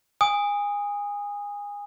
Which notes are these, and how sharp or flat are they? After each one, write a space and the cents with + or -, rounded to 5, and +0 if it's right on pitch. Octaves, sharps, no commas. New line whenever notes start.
G#5 -25 D#6 +0